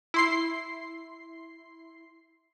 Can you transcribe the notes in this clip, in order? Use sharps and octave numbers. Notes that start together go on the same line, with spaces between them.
E4 C6 C7